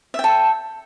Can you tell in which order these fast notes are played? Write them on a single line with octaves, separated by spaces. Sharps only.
E5 G5 A4